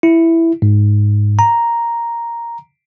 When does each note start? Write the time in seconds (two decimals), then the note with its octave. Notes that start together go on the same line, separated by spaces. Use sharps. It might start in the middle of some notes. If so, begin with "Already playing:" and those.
0.03 E4
0.62 G#2
1.39 A#5